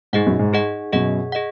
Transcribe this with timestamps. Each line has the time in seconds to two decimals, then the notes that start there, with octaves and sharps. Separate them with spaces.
0.13 G#2 D#4 G#4 D#5 F#5
0.26 F#2 B2
0.39 G#2
0.53 D#4 G#4 D#5 F#5
0.93 F#2 B2 G#4 D#5 F#5
1.32 G#4 D#5 F#5